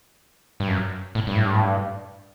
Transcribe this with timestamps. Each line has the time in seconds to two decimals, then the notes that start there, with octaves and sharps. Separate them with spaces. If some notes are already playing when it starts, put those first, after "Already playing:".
0.60 G2
0.68 F#2
1.15 A2
1.27 G2
1.35 A2
1.45 G2
1.54 A2
1.63 G2